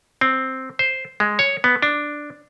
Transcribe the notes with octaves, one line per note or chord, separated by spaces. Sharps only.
C4
C5
G#3
C#5
B3
D4